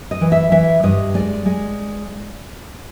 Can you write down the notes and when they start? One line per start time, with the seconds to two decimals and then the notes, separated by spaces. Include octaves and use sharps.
0.11 D#5
0.21 E3
0.32 E5
0.52 E3 E5
0.83 G2 D#5
1.14 G#3 D5
1.46 G#3